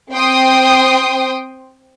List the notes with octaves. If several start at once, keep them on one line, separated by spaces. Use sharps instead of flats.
C4 G5 C6 D#6